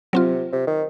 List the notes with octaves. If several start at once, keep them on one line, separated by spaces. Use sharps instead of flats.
C3 F#3 C4 F4
C3
D#3